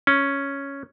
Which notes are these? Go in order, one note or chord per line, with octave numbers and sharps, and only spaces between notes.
C#4